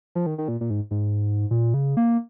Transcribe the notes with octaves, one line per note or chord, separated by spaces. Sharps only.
F3
D#3
D#3
A#2
A#2
G#2
G#2
A#2
C#3
A#3